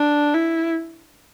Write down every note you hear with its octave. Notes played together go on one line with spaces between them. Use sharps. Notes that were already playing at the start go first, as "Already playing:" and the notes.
Already playing: D4
E4